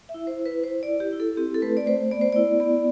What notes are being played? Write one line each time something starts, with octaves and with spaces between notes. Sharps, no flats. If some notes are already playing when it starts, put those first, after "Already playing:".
E5
E4
C5
E4
B4
E4 C5
D5
E4
G4
E4
A4
C4 G4
A4
A3 B4
D5
A3 C5
B3 D5
C5
E4 D5
B3